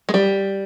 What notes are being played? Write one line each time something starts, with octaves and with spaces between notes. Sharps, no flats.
G#3
G3